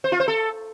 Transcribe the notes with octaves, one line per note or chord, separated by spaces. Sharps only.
C5
F4
C5
A4